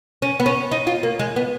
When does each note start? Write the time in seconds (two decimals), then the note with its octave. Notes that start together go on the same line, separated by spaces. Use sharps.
0.22 C#4
0.40 B3
0.46 C#4
0.71 D#4
0.87 F4
1.03 A#3
1.19 G#3
1.36 B3